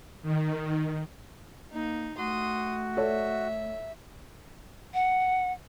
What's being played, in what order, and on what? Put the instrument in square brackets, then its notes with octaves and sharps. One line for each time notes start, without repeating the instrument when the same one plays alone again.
[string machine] D#3
[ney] A#3 [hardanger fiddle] D#4
[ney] A3 [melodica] F#4 [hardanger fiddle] C6 D#6
[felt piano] A4 C#5 D5 [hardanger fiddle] E5
[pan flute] F#5